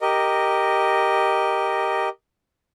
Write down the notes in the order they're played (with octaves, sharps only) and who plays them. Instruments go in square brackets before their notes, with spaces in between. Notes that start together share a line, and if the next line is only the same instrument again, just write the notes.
[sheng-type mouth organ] G4 A#4 D#5